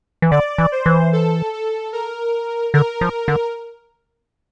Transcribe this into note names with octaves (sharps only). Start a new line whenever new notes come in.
E3
D3 D5
E3
C5
E3
A4
A4
A#4
D3 A#4
F3
D3